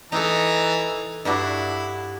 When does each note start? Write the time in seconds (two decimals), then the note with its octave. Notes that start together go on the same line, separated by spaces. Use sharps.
0.12 E3 D#4 A4 A#5
1.25 G2 D4 E4 F#4